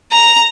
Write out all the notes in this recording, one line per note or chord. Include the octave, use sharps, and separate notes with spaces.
A#5